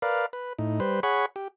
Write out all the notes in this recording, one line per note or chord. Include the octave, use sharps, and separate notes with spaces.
A#4 B4 D5 F5
B4
A2 D#4
G3 B4 C5
G#4 C#5 F#5 B5 C#6
G4